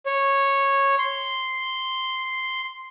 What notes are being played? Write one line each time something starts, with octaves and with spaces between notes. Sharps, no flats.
C#5
C6